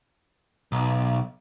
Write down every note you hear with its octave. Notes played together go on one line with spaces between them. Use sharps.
B1